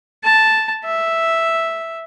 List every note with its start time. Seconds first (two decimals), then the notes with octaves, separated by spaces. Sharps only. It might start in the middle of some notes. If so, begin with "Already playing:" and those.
0.24 A5
0.84 E5